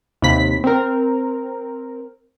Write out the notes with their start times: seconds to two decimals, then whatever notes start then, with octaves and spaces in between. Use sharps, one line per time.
0.22 D#2 C3 B5 B6
0.64 C4 A#4